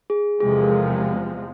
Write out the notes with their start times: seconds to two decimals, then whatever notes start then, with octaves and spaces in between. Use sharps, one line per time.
0.10 G#4
0.41 E2 C3 F3 G#3 G#4
0.51 A4
0.62 A#4